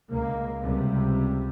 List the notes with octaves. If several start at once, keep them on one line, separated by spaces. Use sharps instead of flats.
C#2 A#3
C#2 C3 G3